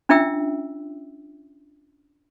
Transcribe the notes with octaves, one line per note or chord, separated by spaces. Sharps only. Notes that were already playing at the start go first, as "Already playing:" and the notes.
C#4 D4 F4 E5 G5 E6